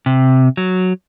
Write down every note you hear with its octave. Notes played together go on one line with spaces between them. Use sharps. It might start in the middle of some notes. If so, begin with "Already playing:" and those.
C3
F#3